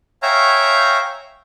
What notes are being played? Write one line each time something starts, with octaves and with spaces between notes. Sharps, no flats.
C#5 E5 F5 G5 G#5 A#5